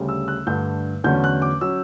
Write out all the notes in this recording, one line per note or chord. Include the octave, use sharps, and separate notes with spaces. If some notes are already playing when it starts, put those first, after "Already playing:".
Already playing: D2 C#3 G3 C#4
E6
F#6
G2 D3 A3 G6
E2 D3 F#3 A3 C#4 G6
F#6
D6
F#3 C#4 E6